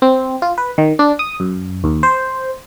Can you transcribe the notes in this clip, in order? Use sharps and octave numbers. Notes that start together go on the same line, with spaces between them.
C4
F4
B4
D#3
D4
D#6
F#2
D#2
C5